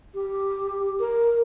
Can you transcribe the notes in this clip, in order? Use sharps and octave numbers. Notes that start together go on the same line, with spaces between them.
G4
A#4